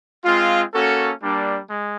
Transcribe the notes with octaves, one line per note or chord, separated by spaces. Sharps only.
G#3 C4 F4
A#3 C#4 F#4 A4
G3 A#3 D4
G#3